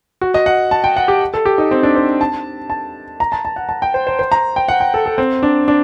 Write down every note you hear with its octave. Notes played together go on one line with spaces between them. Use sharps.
F#4
D#5
F#5
A5
G5
F#5
G4
A4
G4
D#4
C4
D4
C5
A5
A5
A#5
A5
A5
F#5
A5
G5
C5
C5
C5
A#5
G5
F#5
G5
A4
A4
C4
D4
D4